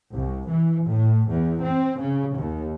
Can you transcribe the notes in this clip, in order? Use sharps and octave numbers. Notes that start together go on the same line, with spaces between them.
C2
E3
A2
E2
C4
C#3
D#2